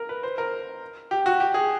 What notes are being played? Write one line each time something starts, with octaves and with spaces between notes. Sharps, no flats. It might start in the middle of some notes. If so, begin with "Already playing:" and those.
Already playing: A#4
B4
C5
A#4
G4
F#4
G4
G#4